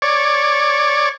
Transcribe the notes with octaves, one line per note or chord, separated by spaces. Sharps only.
C#5 D5